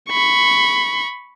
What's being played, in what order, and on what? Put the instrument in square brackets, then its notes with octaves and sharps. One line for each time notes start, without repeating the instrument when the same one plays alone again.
[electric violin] B5 C#6